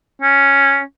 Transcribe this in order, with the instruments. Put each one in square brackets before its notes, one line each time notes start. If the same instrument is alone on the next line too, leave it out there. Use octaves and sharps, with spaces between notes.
[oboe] C#4